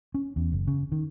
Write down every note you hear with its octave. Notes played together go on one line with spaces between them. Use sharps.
C#4
E2
F#1
C#3
D#3